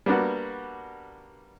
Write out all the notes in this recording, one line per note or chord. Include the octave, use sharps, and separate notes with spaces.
G3 A#3 B3 D4 F#4